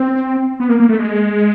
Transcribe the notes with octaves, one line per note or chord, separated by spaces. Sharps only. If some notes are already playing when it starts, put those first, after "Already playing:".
Already playing: C4
B3
A#3
A#3
A3
G#3